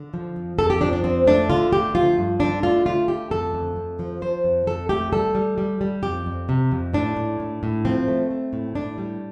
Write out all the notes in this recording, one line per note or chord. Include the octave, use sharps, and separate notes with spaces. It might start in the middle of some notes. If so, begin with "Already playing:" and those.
Already playing: D3
F3
F2
F2 A4
G4
F3 D4
D4
F2 C4
A3 D4
D3 F4
A3 G4
F3 F4
G2
D3 D4
A3 F4
A3 F4
D3 G4
F2 A4
F2
F2
F3
F3 C5
F2
F2 A4
A3 G4
G3 A4
G3
G3
G3
F2 G4
F2
C3
F2
A2 D4
A2
A2
A2
F3 C4
A3
A3
A2
A2 D4
G3